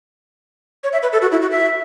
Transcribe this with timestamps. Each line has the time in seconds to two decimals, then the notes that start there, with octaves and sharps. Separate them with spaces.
0.84 C#5
0.93 E5
1.03 B4
1.12 A4
1.22 F#4
1.32 E4
1.42 F#4
1.51 E5